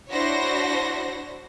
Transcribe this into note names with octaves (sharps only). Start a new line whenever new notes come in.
D4 E4 F#4 C5 C#5 A#6